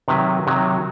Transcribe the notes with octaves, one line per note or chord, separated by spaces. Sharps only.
C3 D#3 F#3 B4
C3 D#3 F#3